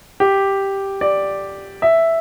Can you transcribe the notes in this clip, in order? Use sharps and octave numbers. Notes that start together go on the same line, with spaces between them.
G4
D5
E5